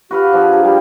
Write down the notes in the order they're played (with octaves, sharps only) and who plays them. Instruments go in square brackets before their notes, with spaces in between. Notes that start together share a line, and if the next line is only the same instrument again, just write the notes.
[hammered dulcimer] F#4 B4 F5 [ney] G4
[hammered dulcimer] F3 D4 G#4
A#4
[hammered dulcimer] G3 [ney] G4